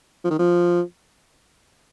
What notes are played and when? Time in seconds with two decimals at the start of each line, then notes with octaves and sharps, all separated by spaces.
0.24 F3
0.31 D#3
0.39 F3